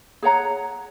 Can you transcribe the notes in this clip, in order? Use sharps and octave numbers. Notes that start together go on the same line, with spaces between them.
G#4 C#5 F#5 A#5